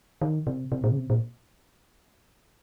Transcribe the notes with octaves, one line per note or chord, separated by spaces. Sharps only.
D#3
C3
C3
A#2
C#3
C3
A#2